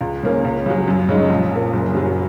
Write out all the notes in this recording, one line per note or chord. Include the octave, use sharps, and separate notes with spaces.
C#2
C#3 A#3 C#4
C#2
C#3 F#3
F#2
C#3 G#3 D#4
A#1
A#2 A#3
F#1
F#2 F#3